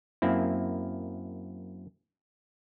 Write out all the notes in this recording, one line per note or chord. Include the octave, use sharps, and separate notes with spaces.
F#2 A#3 C4 E4